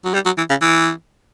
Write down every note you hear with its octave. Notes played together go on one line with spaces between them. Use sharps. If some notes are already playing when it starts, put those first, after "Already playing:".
F#3
G3
F#3
E3
C#3
E3